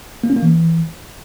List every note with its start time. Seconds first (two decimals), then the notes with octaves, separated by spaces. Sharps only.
0.24 A#3
0.30 C#4
0.36 A#3
0.42 E3